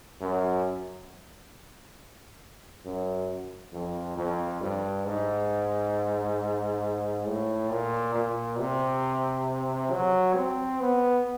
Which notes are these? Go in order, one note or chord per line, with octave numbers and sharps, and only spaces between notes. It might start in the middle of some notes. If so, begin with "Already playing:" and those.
F#2
F#2
F2
F2
G2
G#2
A2
A#2
A#2
C3
F#3
C4
B3